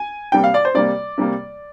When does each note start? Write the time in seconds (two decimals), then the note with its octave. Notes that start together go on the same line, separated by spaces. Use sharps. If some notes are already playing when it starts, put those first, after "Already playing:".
Already playing: G#5
0.32 C3 G3 A#3 G5
0.44 F5
0.54 D5
0.65 C5
0.74 C3 G3 A#3 D5
1.18 C3 G3 A#3